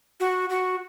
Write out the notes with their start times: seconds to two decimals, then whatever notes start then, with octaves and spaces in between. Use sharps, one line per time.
0.20 F#4
0.50 F#4